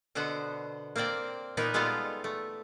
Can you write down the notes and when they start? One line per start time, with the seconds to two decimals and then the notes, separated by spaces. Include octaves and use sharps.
0.15 B2 D3 B3 C5 F#5
0.96 A#3 C4 C5 D5 G5
1.57 A#2 A#3 B3 D#4 A#4 B4
1.74 G3 G#3 B3 F4 A4 F5
2.24 A3